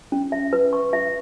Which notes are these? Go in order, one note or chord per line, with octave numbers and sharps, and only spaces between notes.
C#4
E5
B4
C#6
E5